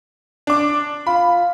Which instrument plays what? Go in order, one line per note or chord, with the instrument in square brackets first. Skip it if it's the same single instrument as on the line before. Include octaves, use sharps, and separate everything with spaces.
[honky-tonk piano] D4 D6
[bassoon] F4 [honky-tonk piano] B5